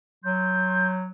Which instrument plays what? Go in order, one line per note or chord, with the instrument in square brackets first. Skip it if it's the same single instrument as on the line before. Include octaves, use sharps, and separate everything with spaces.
[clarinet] F#3 [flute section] C6 G6